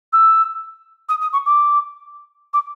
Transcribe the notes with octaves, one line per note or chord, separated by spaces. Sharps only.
E6
D#6
D#6
C#6
D6
D6